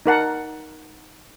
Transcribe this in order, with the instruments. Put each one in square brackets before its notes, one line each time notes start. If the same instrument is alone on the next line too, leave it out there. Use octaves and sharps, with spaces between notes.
[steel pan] D#4 A#4 F#5 A5